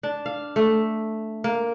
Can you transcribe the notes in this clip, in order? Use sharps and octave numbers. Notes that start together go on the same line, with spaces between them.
D4
F5
A3
A#3